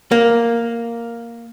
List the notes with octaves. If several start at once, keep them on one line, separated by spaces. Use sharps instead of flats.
A#3